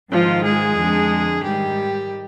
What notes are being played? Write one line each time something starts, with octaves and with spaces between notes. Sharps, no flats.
G#2 D#3 F3 F4
G#3 G#4
F2 D3
G#2 D#3 G3 G4